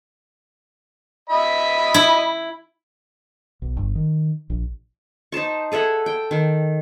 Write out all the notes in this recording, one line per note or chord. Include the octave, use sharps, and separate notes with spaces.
D#5 E5 B5
E4
B1
G1
D#3
A#1
D#4 C5 A5 C#6
G#4 A4 E5 F#5
G5
D#3